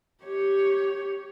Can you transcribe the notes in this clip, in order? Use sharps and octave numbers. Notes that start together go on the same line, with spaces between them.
G4 C#5